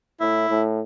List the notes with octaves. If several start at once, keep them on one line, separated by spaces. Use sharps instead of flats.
A2 E4
A2